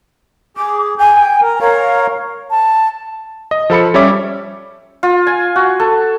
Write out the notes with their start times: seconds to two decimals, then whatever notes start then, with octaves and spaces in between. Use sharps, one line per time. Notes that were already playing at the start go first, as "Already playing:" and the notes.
0.57 G#4 D6
0.98 G5 G#5
1.41 A#4
1.61 A#4 C#5 F5
2.51 A5
3.51 D#5
3.70 F3 A4 B5 C#7
3.94 G3 C#4 C#5 E5 D6
5.03 F4
5.27 G#5
5.56 F#4
5.80 A4